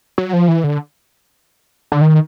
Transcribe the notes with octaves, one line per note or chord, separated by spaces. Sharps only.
F#3
F3
E3
D3
D3
D#3